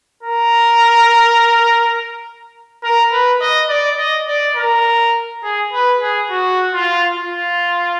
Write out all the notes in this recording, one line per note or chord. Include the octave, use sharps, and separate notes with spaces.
A#4
A#4
B4
D#5
D5
D#5
D5
A#4
G#4
B4
G#4
F#4
F4
F4